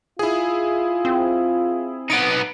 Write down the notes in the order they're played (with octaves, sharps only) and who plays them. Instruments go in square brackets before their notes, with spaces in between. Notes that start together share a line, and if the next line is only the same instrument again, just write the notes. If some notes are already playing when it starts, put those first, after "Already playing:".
[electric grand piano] E4 G#4 [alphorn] F4
[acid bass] C4
[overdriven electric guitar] B3 D#4 [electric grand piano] C#7 D7